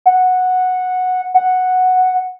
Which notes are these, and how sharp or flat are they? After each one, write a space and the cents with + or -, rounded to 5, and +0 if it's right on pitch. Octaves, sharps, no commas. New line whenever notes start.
F#5 -10
F#5 -5